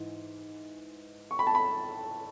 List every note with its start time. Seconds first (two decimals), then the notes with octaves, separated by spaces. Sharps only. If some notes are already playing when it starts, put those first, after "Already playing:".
Already playing: G#2 E3
1.31 C#6
1.39 B5
1.47 A5
1.55 B5